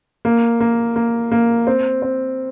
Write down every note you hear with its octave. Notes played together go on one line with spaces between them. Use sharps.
A#3
A#3
A#3
A#3
C4
C4